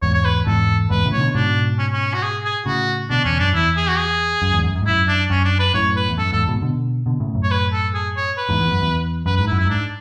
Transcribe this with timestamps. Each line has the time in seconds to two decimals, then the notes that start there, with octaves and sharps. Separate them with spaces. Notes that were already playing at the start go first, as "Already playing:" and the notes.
0.02 E2 G#2 C#5
0.14 C#5
0.24 B4
0.46 E2 G#2 A4
0.90 E2 G#2 B4
1.05 A2 C#3
1.12 E3 C#5
1.19 B2 D3
1.34 G#2 B2 D4
1.78 C#4
1.93 C#4
2.14 F#4
2.23 G#4
2.44 G#4
2.66 A2 C#3 F#4
3.10 B2 D3 D4
3.24 E2 C#4
3.39 F#2 D4
3.54 E2 E4
3.77 G#4
3.89 F#4
3.98 G#4
4.42 F#2
4.53 E2 G#2
4.64 F#2
4.75 F#2
4.83 G#2
4.86 F#2 E4
5.08 D4
5.30 F#2 C#4
5.45 D4
5.59 B4
5.74 F#2 A2 C#5
5.96 B4
6.09 E2
6.18 F#2 A4
6.32 E2 G#2 A4
6.48 G#2 B2
6.62 B2 D3
7.06 B2 D3
7.20 A2 C#3
7.35 F#2 A2
7.43 C#5
7.51 B4
7.73 A4
7.94 G#4
8.16 C#5
8.38 B4
8.49 E2 G#2
8.60 E2
8.71 F#2
8.82 E2
9.26 F#2 B4
9.36 B4
9.39 G#2
9.47 E4
9.52 F#2
9.59 E4
9.66 G#2 D4